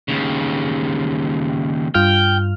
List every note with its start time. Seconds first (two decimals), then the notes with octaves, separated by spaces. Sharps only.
0.08 D#2 C#3
1.94 G2 F4 G5 F6